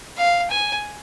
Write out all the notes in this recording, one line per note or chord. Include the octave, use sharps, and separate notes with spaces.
F5
G#5